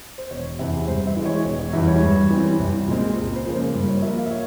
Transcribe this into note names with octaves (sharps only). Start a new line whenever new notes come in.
C5
E1 C#5
E2 C3 E5
G2 C5
E5
E3 G#3
C#5
E1 C#5
C#5
E2 E3 G3 E5
C#5
G2
E3 G3 C4
C2
A#2 G#3 C4
C#2
C5
C#3 F3 A#3
C5
G2
C#5
F3 A#3 E5
F5
E5
C#5